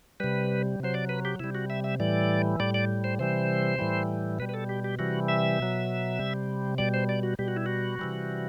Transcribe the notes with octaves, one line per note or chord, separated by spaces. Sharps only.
C3 G3 B4
C3 F#3 C5
D5
B4
G4
C3 G3 E4
F#4
E5
E5
A2 E3 G3 D5
A2 G3 D5
D5
C5
C3 E3 G3 C5
A2 E3 G3
B2 G3 B4
B4
A4
G4
G4
C3 E3 G3 F#4
E5
B2 F#3
C3 G3
B2 G3 D5
C5
D5
F#4
B2 G3 G4
F#4
E4
F#4
C3 E3 G3